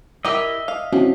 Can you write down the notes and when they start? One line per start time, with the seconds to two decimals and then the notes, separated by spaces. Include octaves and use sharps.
0.25 E4 G4 A#4 D#5 E5
0.68 F5
0.93 F3 C4 C#4 E4 F#4